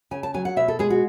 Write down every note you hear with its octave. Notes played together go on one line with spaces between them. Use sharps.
C#3 G#5
A5
F#3 G#5
F#5
B2 E5
A4
G#3 G#4
F#4